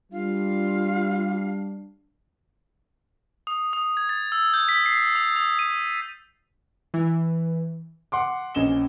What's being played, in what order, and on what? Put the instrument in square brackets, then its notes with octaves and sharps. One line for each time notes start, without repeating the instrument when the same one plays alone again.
[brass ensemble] G3 D4 [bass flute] F4 [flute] F5
[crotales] D#6
D#6
G#6
A6
E6
G6
B6
C7
D#6
D#6
D#7
[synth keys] E3
[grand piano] F#5 C6 D6
A#1 C#4 D#5 E7 G7